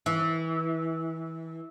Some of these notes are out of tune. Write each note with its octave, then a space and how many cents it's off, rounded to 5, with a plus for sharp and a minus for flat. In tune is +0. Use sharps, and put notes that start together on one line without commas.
E3 -20